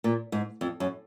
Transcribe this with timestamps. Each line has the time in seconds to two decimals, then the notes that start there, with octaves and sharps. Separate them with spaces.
0.04 A#2
0.32 G#2
0.61 F2
0.80 F#2